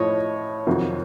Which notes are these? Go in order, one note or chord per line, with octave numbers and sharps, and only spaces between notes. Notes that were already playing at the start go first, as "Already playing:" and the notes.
Already playing: A2 F3 C#5 D#5
F2 C3 D#3 F#3